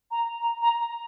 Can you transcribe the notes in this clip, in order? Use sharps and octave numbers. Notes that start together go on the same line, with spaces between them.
A#5
A#5
A#5